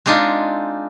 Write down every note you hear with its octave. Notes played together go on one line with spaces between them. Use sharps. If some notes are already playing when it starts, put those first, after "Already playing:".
G#3 C4 D4 D#4 F4